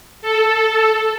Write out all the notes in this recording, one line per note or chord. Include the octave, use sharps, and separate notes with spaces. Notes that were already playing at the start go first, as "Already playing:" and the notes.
A4